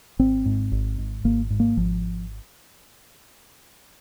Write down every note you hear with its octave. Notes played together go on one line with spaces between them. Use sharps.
G#1 C4
G#2
G#1
G#2
G#1 A#3
G#2
A#3
G#1 F3